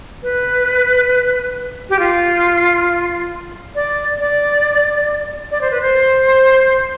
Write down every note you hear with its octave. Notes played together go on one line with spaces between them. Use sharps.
B4
G4
F4
D5
D5
D5
C5
B4
C5